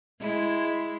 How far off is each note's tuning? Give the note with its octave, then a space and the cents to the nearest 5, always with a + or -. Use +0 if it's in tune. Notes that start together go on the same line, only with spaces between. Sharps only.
G#3 +0 E4 +0